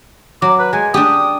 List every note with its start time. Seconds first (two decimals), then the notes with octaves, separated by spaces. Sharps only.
0.42 F#3 D6
0.59 B4
0.73 G#3 G#5
0.94 D4 G4 D#6